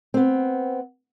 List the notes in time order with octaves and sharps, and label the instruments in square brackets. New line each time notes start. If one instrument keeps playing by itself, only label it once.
[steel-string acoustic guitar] B3 C4